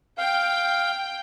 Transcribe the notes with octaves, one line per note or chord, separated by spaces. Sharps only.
F5 G5